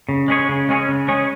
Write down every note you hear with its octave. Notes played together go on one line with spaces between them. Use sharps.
C#3
G#3 C#4 G#4 C#5
C#3
G#3 C#4 G#4 C#5
C#3
G#3 C#4 G#4 C#5